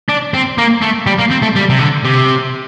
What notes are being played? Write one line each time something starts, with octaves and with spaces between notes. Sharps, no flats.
D4
C4
A#3
A3
G3
A#3
C4
A3
G3
C3
D3
C3